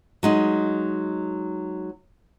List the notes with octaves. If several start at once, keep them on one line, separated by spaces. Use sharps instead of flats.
F#3 G#3 D#4